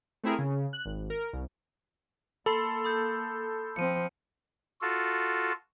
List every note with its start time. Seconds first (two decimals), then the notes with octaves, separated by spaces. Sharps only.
0.24 A3 C4 E4 G#4 A#4
0.39 C#3
0.73 F#6
0.85 G#1
1.10 A#4
1.33 C2
2.46 A#3 A4 B5 C6 C7
2.84 B5 D#6 G6
3.76 F3 C4 C#7 D#7
4.81 F4 F#4 A4